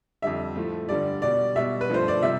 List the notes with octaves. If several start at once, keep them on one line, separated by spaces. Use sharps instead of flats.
F2 D3 G3 E5
A2 F3 A3
G2 D3 G3 D5
B2 G3 D5
B2 G3 E5
B4
G2 F3 A3 C5
D5
C3 G3 E5